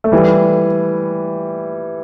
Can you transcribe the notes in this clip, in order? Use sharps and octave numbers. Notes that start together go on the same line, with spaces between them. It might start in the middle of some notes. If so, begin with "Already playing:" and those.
A3
E3 G3